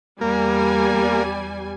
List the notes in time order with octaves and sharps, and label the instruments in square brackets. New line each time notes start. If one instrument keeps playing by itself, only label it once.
[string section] E2 G3 G#5 [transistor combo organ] A#3